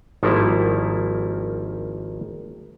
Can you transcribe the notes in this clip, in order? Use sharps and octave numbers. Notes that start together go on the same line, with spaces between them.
G#1 D#3 F3 G3 A#3 E4